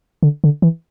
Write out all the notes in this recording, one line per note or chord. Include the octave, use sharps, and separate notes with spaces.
D3
D3
E3